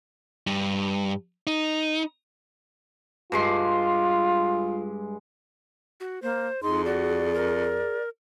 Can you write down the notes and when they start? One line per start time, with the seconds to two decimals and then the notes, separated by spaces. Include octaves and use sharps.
0.47 G2
1.47 D#4
3.32 G2 G#3 F4 C6
6.00 F#4
6.22 A#3 C5
6.63 F2 D#4 G#4 C6
6.85 F#4 D5
7.34 A#4